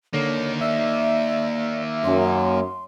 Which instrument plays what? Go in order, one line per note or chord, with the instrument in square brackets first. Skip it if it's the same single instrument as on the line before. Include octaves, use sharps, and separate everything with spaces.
[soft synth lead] D3 [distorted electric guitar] A#3 D#4 [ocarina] C#5
[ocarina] D5 [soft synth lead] E5
[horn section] F#2 [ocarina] C6